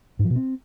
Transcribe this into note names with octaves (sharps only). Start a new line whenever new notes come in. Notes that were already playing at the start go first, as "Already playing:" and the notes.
G#2
F3
B2
C4